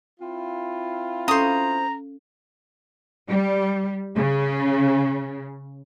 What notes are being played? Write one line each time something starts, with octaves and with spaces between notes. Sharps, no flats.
C4 E4 F4
C#4 A4 C5 F5 A#5 D#6
G3
C#3